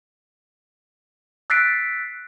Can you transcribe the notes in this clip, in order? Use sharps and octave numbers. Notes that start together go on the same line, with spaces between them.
E6 F#6 A6 B6 C7 D7